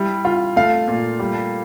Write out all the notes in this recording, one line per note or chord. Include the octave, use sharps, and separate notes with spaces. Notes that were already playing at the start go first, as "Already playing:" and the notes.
Already playing: G3 E4
F4
A3 F5
A#2
G3